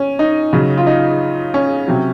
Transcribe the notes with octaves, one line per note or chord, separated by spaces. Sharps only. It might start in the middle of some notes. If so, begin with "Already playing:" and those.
Already playing: C#4
D#4
C#3 F#3
F4
D#4
C#4
C3 F#3